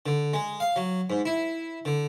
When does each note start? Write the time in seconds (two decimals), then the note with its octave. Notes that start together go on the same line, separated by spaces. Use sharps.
0.06 D3
0.34 G#3
0.60 F5
0.76 F#3
1.10 G#2
1.25 E4
1.85 D3